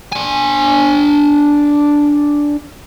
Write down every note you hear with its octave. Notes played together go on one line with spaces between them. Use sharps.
D4 G#5